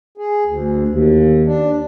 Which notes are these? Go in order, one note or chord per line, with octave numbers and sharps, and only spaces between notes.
G#4
D2
D#2
D4